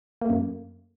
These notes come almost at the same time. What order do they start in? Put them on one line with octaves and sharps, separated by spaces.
A#3 A3 F#2